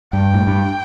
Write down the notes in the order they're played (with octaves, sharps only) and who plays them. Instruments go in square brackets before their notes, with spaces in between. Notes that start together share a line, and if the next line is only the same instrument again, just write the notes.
[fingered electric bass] G2 [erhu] G5
[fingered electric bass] A2
G2